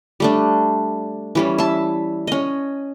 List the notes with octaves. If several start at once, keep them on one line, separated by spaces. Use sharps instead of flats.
G3 A3 D4
E3 G3 C#4
E5 A5
C#4 D#5